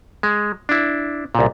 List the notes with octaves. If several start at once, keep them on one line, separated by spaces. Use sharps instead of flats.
G#3
D4 E4
C2 A#2